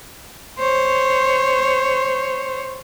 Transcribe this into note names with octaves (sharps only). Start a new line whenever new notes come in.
C5 C#5